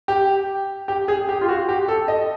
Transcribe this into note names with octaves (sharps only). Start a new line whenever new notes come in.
G4
G4
G#4
G4
F4
F#4
G4
A4
D#5